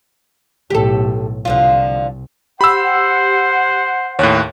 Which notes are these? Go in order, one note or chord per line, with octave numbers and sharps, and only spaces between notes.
B1 A2 G4 A4
C2 D3 F3 F4
G4 C5 F#5 B5 E6
D#2 A2 C#5 F#6